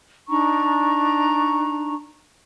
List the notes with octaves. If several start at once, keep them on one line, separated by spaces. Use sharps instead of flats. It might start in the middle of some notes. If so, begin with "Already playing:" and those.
D4 D#4 A#5 C#6